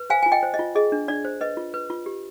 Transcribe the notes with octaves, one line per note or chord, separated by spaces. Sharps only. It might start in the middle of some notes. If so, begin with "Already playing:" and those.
Already playing: B4
C5 F5 G#5
F4 G#5
D#5 G5
C5
D#5
F4
G#4 D#5
D4
D4 D5
C5
B4 D#5
F4
B4
F4
G4